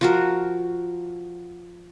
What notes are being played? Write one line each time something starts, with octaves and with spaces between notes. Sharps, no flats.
F3 F#4 A#4